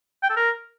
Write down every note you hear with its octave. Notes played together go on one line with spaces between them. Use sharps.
G5
A4
A#4